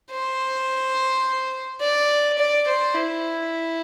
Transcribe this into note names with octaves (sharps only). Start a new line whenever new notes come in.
C5
D5
D5
C5
E4